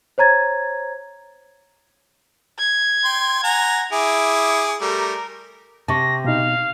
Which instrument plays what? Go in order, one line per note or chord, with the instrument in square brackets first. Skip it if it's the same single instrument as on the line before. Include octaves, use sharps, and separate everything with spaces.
[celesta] C5 C#5 A#5 G#6 A6
[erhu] G#6
[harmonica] G5 C6
F#5 G#5 A#5
[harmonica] E4 G#4 [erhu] D6
[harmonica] G3 A3 [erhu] A#4
[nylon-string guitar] C3 [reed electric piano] A5 C#6 [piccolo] A#6
[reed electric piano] B2 D#4 [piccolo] F5